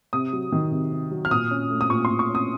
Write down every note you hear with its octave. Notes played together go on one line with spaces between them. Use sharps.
C3 D#6
F#3
D#3
C3
C3
F#3
F6
A#2 D#6
C#4
A3
D#6
A#2 C#6
C6
A#2
C#6
C#4
D#6